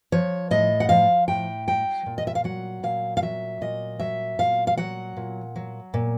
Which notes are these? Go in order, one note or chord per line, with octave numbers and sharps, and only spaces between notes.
F3 C#5
A2 D#5
F#5
F3 F5
A2 G5
F#3 G5
A#2
D#5
E5
F5
F#3 F#5
A#2 F5
F5
F#3 E5
A#2 D#5
F#3 E5
A#2 F5
F5
F#3 F#5
A#2
F#3
A#2